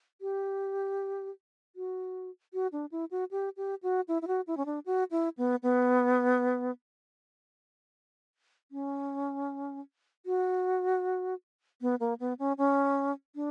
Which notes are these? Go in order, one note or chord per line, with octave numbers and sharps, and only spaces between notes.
G4
F#4
F#4
D4
E4
F#4
G4
G4
F#4
E4
E4
F#4
E4
C#4
D4
F#4
E4
B3
B3
C#4
F#4
B3
A#3
B3
C#4
C#4
D4